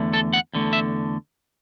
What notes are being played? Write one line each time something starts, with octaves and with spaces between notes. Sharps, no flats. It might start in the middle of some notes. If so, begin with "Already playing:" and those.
Already playing: E2 D3 A3
A4
F#5
E2 D3 A3
E5